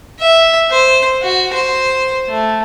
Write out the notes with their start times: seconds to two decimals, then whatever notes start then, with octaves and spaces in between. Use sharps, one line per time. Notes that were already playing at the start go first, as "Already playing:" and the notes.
0.20 E5
0.71 C5
1.23 F#4
1.54 C5
2.29 A3